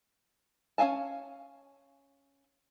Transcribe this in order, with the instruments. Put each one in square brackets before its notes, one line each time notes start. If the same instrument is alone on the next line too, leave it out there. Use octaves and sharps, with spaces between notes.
[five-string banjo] C#4 A4 F5 G#5 A5